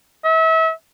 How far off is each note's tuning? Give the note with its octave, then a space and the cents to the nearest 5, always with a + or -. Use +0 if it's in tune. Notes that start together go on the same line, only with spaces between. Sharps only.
E5 -35